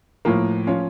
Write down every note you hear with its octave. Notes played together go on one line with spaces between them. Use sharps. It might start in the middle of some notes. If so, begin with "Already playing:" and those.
A2 F3 A#3
F3 C#4 F4